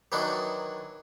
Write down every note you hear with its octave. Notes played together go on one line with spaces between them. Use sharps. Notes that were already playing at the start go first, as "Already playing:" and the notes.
D#3 E3 F#3 B3 D4 D#4